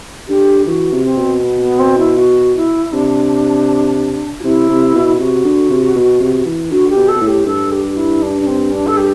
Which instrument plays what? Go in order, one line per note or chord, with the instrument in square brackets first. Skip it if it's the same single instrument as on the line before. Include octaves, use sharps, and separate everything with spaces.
[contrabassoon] D3 [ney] G4
[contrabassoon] E3 [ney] F#4
[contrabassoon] C3
[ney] C4
[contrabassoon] B2
[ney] B3
B3
C4
E4
F#4
E4
[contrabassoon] C3 [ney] D4
[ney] F#4
[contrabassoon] C3 [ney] E4
[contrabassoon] C3
B2
[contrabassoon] C3 [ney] F#4
[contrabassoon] D3
C3
B2
C3
E3
[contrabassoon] D3 [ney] F#4
[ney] G4
[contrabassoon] B2
[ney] A4
[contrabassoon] B2
A2
[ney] G4
[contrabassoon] G2 [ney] A4
[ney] G4
E4
D4
D4
C4
D4
A4
G4